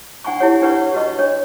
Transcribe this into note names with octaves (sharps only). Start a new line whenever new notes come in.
D4 F#5 G#5 B5 C#6
E4 G4 C#5 F#5
D4 G4 B4 C#5 F#5 C#6
F#4 B4 D#5 C#6
D4 C#5